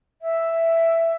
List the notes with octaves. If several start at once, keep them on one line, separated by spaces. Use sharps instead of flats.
E5